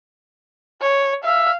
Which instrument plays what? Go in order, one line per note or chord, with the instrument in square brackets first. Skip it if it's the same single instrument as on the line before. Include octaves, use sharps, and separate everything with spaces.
[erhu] C#5
[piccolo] E5 [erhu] F5